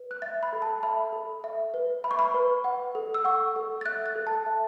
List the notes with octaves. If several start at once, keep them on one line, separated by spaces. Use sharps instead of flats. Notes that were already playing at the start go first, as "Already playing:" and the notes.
Already playing: B4
F#6
E5 A6
B5
A4
A5
E5 B5
A4
E5
B4
E5 B5
C#6
B5
B4
F#5
A4
E6
F#5 C#6
A4
A6
E5 F#6
A6
A4
A5
E5